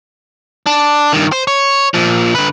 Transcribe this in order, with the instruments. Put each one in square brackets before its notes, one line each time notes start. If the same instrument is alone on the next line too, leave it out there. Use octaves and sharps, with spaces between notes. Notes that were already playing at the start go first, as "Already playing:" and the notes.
[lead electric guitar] D4
G2 D#3
C5
C#5
A#2 F3
D3 B4